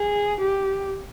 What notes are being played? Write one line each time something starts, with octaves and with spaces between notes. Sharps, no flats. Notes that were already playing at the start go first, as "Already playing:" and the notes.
Already playing: G#4
G4